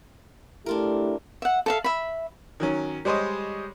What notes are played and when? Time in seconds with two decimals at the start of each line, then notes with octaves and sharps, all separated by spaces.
0.66 A3 D4 E4 F4 G4 A#4
1.42 E5 F#5
1.66 A4 E5 F5
1.84 E5 B5
2.60 D#3 F#3 C#4
3.05 G3 G#3 C5 C#5 D#5